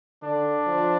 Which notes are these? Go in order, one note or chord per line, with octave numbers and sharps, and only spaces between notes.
D3 D4
F3